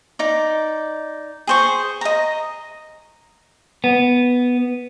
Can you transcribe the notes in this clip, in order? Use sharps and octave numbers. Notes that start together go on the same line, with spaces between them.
D#4 D5
G#4 C5 C#6
D#5 A#5
B3